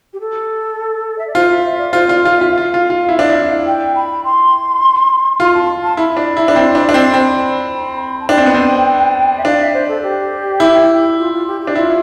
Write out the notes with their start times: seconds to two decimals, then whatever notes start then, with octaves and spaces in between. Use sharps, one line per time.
0.13 G4
0.20 A4
1.18 E5
1.27 D5
1.35 F4 C5
1.50 E5
1.65 E5
1.78 D5
1.93 F4 C5
2.08 F4 D5
2.22 F4 F5
2.29 D5
2.36 F4 E5
2.50 F5
2.58 F4
2.74 F4
2.90 F4
3.09 E4
3.19 D4
3.29 E4
3.66 G5
3.95 B5
4.24 C6
5.40 F4 C6
5.54 A5
5.83 A5
5.97 E4 B5
6.17 D4
6.37 E4
6.48 D4
6.56 C4
6.75 D4
6.89 D4
6.94 C4
7.13 C4 B5
8.20 A5
8.29 D4 G5
8.37 C4
8.46 B3
8.54 C4
9.37 E5
9.45 D4 F5
9.59 E5
9.73 C5
9.88 A4
10.02 G4
10.60 E4
11.18 F4
11.32 F4
11.47 G4
11.61 G4
11.67 D4
11.75 E4 F4